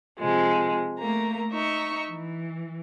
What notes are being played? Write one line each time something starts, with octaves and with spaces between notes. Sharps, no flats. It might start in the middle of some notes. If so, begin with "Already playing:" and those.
C3 F3 G#3
A3 A#3 A#5
D#4 E5 C#6
E3